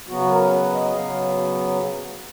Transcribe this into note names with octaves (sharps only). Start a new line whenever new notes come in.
C#3 F#3 B3 F#4
A#4
B4
D#5
C#3 F#3 B3 F5